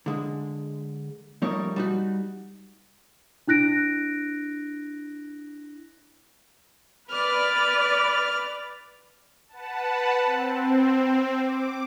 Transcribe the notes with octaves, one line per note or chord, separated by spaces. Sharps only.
D3 G#3
F3 G3 A3 D#4 A#4 C#5
G3 D#4 F#4
D4 E4 F#6 A#6 D7
B4 D5 F6
B4 F#5 A5
C4
D6